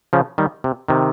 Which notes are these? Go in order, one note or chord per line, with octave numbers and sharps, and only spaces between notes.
C#3 F3
D#3 G3
C3
C3 D#3